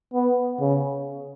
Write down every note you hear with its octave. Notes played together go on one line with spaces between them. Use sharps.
B3
C#3